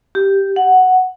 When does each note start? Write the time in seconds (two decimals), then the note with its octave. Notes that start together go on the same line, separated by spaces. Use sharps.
0.15 G4
0.56 F#5